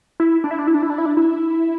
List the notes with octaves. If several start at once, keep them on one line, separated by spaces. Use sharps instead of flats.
E4
D4
E4
D4
E4
D4
E4
D4
E4
D4
E4